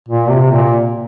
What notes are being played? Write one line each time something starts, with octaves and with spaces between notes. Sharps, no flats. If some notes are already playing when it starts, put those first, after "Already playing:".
A#2
C3
A#2